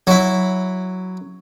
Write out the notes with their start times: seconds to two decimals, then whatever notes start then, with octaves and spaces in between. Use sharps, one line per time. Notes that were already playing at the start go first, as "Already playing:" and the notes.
0.07 F#3 E4